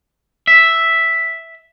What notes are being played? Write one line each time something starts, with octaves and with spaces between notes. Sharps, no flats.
E5